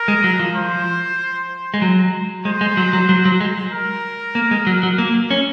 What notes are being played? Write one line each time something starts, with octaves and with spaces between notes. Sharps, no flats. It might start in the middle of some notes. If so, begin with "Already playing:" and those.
Already playing: A#4
G#3
F#3
F3
C5
G#3
F#3
G#3 C5
G#3
F#3
F#3
F#3
F#3
G#3
A#4
A#3
G#3
F#3
F#3
A#3
C#4